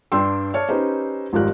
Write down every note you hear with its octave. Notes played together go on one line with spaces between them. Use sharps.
G2 D4 G5 C6 E6
C#5 D5 A5 F6
C#4 D#4 G4 B4 C5
G#1 F2 F3 G3 A#4 F#6